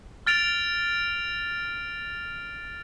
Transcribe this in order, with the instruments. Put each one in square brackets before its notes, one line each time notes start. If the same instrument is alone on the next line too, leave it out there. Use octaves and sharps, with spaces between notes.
[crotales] F6 A6 D7 F7